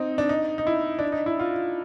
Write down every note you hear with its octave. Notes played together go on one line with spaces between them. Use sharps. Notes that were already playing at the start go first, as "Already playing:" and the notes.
Already playing: C4 D#4
D4
D#4
D#4
E4
D4
D#4
E4
F4